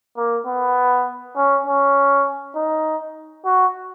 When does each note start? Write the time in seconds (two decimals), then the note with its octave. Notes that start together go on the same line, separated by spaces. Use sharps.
0.17 A#3
0.46 B3
1.37 C#4
1.66 C#4
2.55 D#4
3.45 F#4